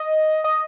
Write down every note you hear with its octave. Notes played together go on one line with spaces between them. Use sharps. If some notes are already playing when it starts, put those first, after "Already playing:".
Already playing: D#5
D#5